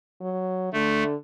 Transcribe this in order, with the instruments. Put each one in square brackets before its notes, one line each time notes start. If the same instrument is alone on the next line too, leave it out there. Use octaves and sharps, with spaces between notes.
[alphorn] F#3
[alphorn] D3 [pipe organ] A3